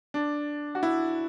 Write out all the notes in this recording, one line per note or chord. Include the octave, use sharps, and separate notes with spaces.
D4
F#4
E4